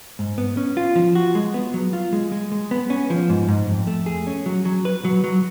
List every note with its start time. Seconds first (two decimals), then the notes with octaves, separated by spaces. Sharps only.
0.19 G#2
0.38 B3
0.57 C#4
0.77 F4
0.96 F3
1.15 F#4
1.35 G#3
1.54 B3
1.74 F#3
1.93 F4
2.13 G#3
2.32 G#3
2.52 G#3
2.71 B3
2.90 C#4
3.10 F3
3.30 G#2
3.48 G#2
3.69 F2
3.87 A3
4.06 G#4
4.27 C#4
4.46 F#3
4.65 F#3
4.85 B4
5.05 F#3
5.24 F#3